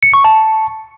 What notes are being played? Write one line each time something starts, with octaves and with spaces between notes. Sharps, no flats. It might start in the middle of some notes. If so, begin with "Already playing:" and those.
C#7
C#6
A5